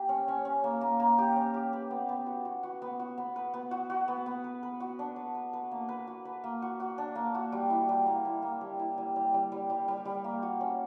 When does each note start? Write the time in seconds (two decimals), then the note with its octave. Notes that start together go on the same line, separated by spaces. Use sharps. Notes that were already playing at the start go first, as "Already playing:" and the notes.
Already playing: A#3 G4
0.09 C#4
0.28 C#4
0.45 C#4
0.64 A#3
0.81 A#3
1.00 A#3
1.18 G4
1.36 C#4
1.54 G4
1.73 B4
1.91 B3
2.09 B3
2.26 F#4
2.45 F#4
2.63 F#4
2.82 B3
2.99 F#4
3.18 B3
3.36 B4
3.54 B3
3.71 F#4
3.90 F#4
4.08 B3
4.26 B3
4.44 B4
4.63 B4
4.80 F#4
4.99 D4
5.16 B4
5.35 B4
5.53 B4
5.71 A#3
5.89 B4
6.07 F#4
6.25 B4
6.44 A#3
6.62 F#4
6.80 F#4
6.98 D4
7.15 A#3
7.35 F#4
7.52 G3
7.70 E4
7.89 G3
8.06 A#3
8.25 E4
8.42 A#3
8.61 G3
8.79 E4
8.98 G3
9.16 G3
9.34 G3
9.52 G3
9.70 G3
9.88 G3
10.05 G3
10.24 A#3
10.43 F#4
10.61 C#4